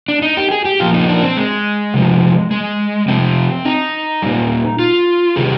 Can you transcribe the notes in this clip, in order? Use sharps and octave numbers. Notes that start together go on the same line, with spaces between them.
D4
D#4
G4
G#4
G4
A#2 F3 F4
D#4
D4
C4
G#3
C3 F3
G#3
C3 F3 C4
D#4
A#2 G3
F4
C3 D#3 G3 G#4